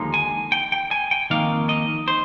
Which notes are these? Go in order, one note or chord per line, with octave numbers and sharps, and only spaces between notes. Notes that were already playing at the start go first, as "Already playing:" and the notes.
Already playing: D#2 D3 F3 G#3 D#4
G#5
G5
G5
G#5
G5
F2 D#3 A#3 D#4 F5
D#5
C5